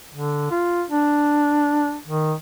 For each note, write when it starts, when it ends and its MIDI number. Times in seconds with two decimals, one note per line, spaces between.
0.14 0.50 50
0.51 0.83 65
0.90 1.97 62
2.07 2.33 51